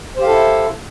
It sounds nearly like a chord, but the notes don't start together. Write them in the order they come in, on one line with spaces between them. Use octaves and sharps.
C5 G4 F5 A4 E4